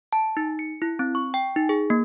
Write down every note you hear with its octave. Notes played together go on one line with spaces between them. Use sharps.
A5
D#4
C#7
E4
C4
C#6
G5
D#4
G#4
A#3